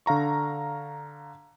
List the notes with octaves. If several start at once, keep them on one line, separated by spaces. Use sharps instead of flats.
D3 F5 A#5 C#6